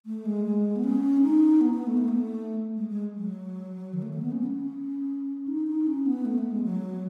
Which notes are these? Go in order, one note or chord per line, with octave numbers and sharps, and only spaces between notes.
A3
G#3
G#3
B3
C#4
D#4
B3
B3
A3
B3
A3
G#3
G#3
F#3
D#3
A3
A3
B3
C#4
C#4
D#4
D#4
C#4
B3
A3
B3
G#3
F#3